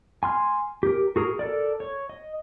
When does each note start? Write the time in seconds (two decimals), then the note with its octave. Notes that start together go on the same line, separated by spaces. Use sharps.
0.23 G#5 C6 F6
0.83 G4 A#4
1.16 F#4 G#4 A#4
1.39 A4 A#4 D5
1.80 C#5
2.09 D#5